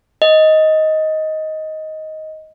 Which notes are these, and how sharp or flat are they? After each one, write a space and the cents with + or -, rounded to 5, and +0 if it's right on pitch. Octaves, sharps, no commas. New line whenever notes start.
D#5 +10